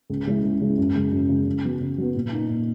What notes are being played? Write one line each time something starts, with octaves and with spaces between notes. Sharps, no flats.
C#2
C#3 G#3 C#4 E4
C#2
C#3 G#3 C#4 E4
F#2
C#3 G#3
F#2
C#3 G#3
C#3
F#3 B3
C#3
F#3 B3
A#2
A#3 D#4
A#2